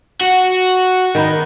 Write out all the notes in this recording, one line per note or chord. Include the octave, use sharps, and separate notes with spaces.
F#4
D#3 B3 D#4